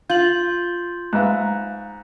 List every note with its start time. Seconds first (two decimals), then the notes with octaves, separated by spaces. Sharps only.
0.10 F4 G6 F#7
1.13 G#2 B4 E5 F5 A#5 F#6